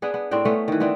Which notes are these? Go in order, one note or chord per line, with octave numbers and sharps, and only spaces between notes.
B3 D4 G#4
B3
A2 C4 D4 G5
A3 B3 C#4
D#3 E3
B3 C4 D4 E4